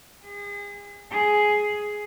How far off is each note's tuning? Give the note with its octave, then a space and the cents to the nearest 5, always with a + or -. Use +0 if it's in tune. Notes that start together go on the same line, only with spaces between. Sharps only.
G#4 -35
G#4 +10